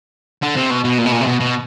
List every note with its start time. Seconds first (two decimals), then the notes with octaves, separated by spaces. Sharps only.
0.43 D3
0.56 C3
0.71 B2
0.84 B2
0.98 A#2
1.06 B2
1.12 A#2
1.21 C3
1.26 B2
1.40 B2